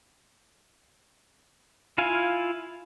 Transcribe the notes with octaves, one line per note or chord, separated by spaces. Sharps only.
E4 F4 F5 G#5